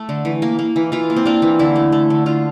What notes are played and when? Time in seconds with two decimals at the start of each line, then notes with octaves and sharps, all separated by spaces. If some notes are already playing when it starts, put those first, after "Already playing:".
Already playing: A3
0.09 D3
0.25 E3
0.42 A#3
0.59 A#3
0.76 E3
0.92 E3 F4
1.10 A#3
1.16 C4
1.25 A#3 D4
1.42 E3
1.59 D3 E4
1.76 A3
1.92 A3
2.10 D3
2.26 D3 F4